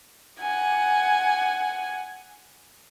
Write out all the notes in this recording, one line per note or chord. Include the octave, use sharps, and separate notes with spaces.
F#5 G#5